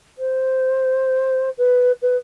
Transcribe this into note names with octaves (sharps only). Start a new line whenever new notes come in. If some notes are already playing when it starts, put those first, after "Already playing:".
C5
B4
B4